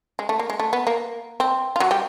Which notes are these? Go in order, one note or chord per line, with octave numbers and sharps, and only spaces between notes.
G#3
A3
A#3
G#3
A3
B3
A#3
C4
F4
F#3 F#4
G3 G4